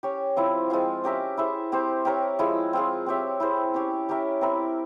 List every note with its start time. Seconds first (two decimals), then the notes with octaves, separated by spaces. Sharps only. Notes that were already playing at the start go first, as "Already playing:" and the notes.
0.03 C#4 G4 C#5
0.36 F3 C4 E4
0.70 F3 G#3 C4 F4
1.04 C#4 G4 A#4 E5
1.37 E4 G#4 C5 E5
1.72 C4 G4 C5
2.05 C4 G4 A#4 C#5
2.39 F3 G#3 E4 G#4
2.73 C4 F4 G#4
3.06 C4 G4 C#5 E5
3.40 E4 G#4 C5
3.74 C#4 G4 C#5
4.09 C#4 G4 A#4 E5
4.41 C4 E4 A#4